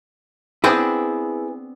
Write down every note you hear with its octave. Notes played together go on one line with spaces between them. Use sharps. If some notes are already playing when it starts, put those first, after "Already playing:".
B3 C4 D4 E4 G#4 B4